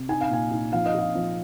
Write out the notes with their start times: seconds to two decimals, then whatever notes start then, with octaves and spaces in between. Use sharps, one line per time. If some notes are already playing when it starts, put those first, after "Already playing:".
Already playing: C3
0.09 D#4 G#5
0.21 F5
0.30 A#2 G#5
0.51 D#4
0.73 F3 F5
0.86 D#5
0.94 F4 F5
1.15 F3